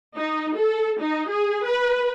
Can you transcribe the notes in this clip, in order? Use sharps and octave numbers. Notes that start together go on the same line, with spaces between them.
D#4
A4
D#4
G#4
B4